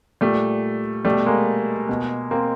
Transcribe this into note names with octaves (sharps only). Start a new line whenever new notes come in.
A#2 G3 A3
B2 G3 A3
G#3 A#3
B2
A#3 C4